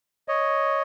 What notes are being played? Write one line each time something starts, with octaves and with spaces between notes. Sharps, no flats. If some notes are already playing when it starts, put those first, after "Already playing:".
C#5 D#5